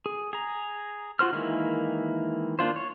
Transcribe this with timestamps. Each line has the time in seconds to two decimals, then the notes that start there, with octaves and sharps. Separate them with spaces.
0.06 G#4
0.33 G#4 A#5
1.19 F4 F#4 C5 F6
1.33 D#3 E3 G#3 A#3 E4
2.59 A#3 D4 F4 C5
2.76 C#5